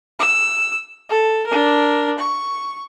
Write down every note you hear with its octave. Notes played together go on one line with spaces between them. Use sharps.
E6
A4
D4 A#4
C#6